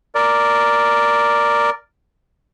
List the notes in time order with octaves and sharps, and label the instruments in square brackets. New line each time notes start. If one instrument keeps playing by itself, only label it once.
[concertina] A#4 D5